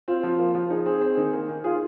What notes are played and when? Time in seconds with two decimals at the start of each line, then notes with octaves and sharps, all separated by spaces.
0.08 C4 F4
0.23 F3
0.39 A#3
0.55 F3
0.70 D#4 G#4
0.86 C4 G#4
1.02 C4
1.17 D#3
1.33 A#3
1.49 D#3
1.64 F4 G#4